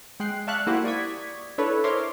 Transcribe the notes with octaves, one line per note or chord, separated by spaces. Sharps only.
G#3 G5 F#6 C7
D5 E5 F5 A5 C#6 F#6
A#3 E4 F#4 G4 C5
D5 C#6 D#6 G#6 B6
D4 E4 A4 B4 C#5
A#4 C5 C#5 E5 C6 D6